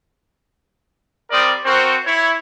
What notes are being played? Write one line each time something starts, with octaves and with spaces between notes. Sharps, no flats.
G3 C4 A#4 D5 D#6
C4 F#4 A#4 C5 C#6
E4 C#5